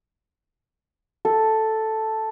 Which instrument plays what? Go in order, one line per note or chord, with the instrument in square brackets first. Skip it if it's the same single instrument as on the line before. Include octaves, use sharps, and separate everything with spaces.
[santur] A4